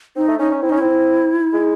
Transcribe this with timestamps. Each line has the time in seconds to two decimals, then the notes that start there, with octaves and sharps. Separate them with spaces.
0.16 C4 D#4
0.28 A3
0.39 C#4 D#4
0.51 C#4
0.62 C4 E4
0.69 C#4 D#4
0.78 C4 E4
1.53 G#3